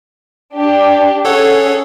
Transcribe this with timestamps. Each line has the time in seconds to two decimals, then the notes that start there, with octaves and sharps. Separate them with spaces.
0.53 D4 G4
1.25 C#4 G#4 A4 C#5 F#5